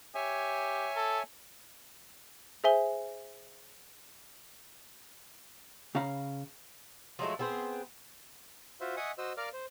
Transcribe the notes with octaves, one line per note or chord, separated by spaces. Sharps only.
G4 C#5 E5 G#5
A4
G#4 C5 E5 G#5 G7
C#3 C#4 F5 A#5 B5
F3 F#3 G#3 A3
B3 C4 G#4 C5
F4 F#4 C5 E5
D#5 E5 F#5 G#5 C#6 D#6
F#4 C5 D#5 E6
A#4 D5 F5 D6 F6
C5